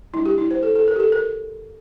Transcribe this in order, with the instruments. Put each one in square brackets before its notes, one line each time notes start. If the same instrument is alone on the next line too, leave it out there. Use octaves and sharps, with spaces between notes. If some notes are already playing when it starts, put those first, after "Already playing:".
[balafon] G3 A#3 D4 E4
G4
E4
C5
A4
A4
A#4
G4
A4
A#4